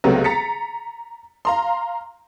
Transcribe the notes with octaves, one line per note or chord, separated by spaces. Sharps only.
C#2 C3 F#3 A3 B3
A#5 A6 B6 C#7
F5 A#5 C6